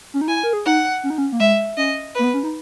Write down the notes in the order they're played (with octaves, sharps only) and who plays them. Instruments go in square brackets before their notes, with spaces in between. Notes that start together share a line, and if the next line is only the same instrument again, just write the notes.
[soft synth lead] C#4
D#4
[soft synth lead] E4 [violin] G#5
[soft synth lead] A#4
G#4
[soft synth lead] D#4 [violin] F#5
[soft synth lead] C#4
D#4
C#4
A#3
[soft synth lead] G#3 [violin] E5
[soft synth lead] C#4 [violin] D#5
[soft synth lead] A#3 [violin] B4
[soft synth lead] B3
C#4
D#4